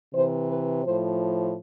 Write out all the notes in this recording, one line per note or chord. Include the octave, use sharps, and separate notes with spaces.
C3 E3 C5
B4
A2 F3 C5